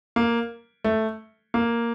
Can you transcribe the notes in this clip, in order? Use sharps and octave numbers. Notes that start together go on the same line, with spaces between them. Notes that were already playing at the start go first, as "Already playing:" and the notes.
A#3
A3
A#3